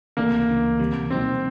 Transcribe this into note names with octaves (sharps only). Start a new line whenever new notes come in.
C#2 C3 E3 A3 A#3 D4
C#2 C#3 E3
D2 C3 E3 G3
B2 F#3 A#3 C4 D#4